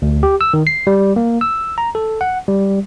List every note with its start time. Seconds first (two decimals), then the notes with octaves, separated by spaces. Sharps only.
0.02 D2
0.23 G4
0.41 E6
0.54 D#3
0.67 C7
0.87 G3
1.16 A#3
1.41 E6
1.78 A#5
1.95 A4
2.21 F#5
2.48 G3